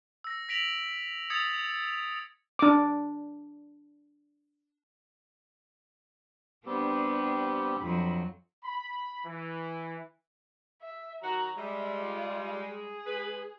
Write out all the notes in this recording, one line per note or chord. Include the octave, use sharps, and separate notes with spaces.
E6 A#6
A#6 B6 D7 F7 F#7
D#6 E6 G#6 A6 C#7 F7
D4 D6
G3 B3 C4 D4 G4
F2 F#3 B5
B5
E3
E5
D#3 F#3 F#4 A#5
G3 G#3 E5
F4
G#4
G#3 B4